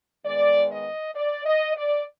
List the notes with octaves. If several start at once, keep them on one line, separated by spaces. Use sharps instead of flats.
D#3 G#3 B3 D5
D#5
D5
D#5
D5